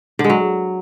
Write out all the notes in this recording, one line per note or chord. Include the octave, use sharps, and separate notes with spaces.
D3
G#3
F#3